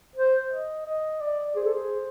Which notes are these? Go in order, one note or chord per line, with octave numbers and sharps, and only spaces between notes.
C5
D#5
D#5
D5
G#4 C5
A4
G#4